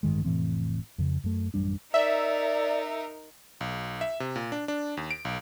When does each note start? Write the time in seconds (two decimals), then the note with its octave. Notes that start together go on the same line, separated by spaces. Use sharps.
0.03 A1 G2 D#3 G#3
0.25 F1 A2 E3 C4
0.98 F2 C#3
1.24 F#2 A3
1.54 A1 F#2 G3 D4
1.94 D#4 A#4 D5 E5
3.61 B1
4.01 E5
4.20 C3
4.36 A#2
4.52 D4
4.68 D4
4.97 D#2
5.11 D7
5.25 B1